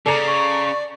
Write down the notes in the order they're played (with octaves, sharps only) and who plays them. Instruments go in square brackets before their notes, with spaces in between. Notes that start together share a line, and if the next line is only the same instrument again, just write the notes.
[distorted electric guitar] C#3 [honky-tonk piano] A4 A#5 [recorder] D5 [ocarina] D6
[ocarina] C#6